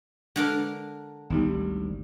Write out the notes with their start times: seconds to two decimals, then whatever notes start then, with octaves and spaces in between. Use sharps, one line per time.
0.36 D3 G#3 D4 A#4
1.30 G#1 D2 G3 B3 D#4 G4